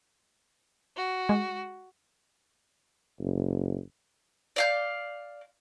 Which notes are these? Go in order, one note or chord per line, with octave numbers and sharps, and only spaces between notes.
F#4
G#3
F#1
D5 F5 G6